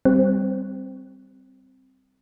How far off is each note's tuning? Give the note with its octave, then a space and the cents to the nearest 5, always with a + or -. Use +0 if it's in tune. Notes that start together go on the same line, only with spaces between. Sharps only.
G3 +0 C4 -5